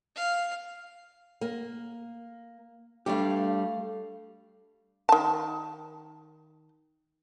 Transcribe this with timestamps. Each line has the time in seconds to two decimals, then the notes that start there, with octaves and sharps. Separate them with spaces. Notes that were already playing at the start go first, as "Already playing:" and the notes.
0.16 F5
1.41 A#3
3.06 G3 A3 D4 G4 F5
5.09 D#3 A5